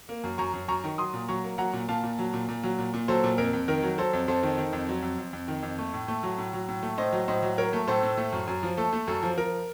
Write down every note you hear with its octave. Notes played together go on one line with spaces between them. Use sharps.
A#3
F#2
F#2 A#5 C#6
F#2
F#2 A#5 C#6
D#3
F#3 C6 D#6
A#2
F#3 A#5 C#6
A#3
F#3 F#5 A#5
A#2
A#2 F5 A5
A#2
F#3
A#2
A#2
F#3
A#2
A#2
F#3 A4 C5
A#2
F2 A#4
F2
D#3 A#4
F#3
F#3 A4 C5
F2
F2 A4 C5
D#3
D#3
F2
F#3
F2
F2
F2
D#3
F2
A3
A2
A3
F#3
A2
F#3
A2
A3
A2 C5 D#5
F#3
A2 C5 D#5
F#3
F#3 A#4 C#5
A3
A2 A4 C5
A2
A3
F#2
F#2
F3
A3 A4
A3
F#2 A4
F3
F3 A#4